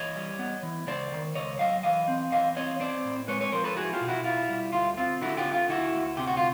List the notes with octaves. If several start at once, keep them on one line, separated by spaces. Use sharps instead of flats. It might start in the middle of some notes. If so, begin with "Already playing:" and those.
Already playing: E3 C#5 D#5
G3
B3
E3
C#2 C5 D5
D#3
C#2 C#5 D#5
F#3 D#5 F5
E3 D#5 F5
C4
E3 D#5 F5
C4 C#5 D#5
C4 C5 D5
A2
G#3 B4 C#5
B4 C#5
F3 A#4 C5
A4 B4
E4 F#4 G#4
F4 G4
B2
E4 F#4
E4 F4
G3
D2 F4
C4 F4
D3 E4 F#4
F4 G4
D3
F4
D2 E4 F#4
D2
C3 G4
F#4
F4